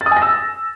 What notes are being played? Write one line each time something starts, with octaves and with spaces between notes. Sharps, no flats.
A6
D#6
G#5
A#6
E6